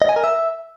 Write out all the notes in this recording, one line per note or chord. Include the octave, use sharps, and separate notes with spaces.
D#5
G#5
A#4
E5